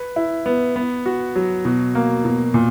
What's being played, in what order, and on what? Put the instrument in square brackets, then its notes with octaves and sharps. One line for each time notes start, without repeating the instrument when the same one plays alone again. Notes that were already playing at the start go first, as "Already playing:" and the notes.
Already playing: [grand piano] B4
E4
B3
B3
F#4
F#3
B2
A#3
B2
A#2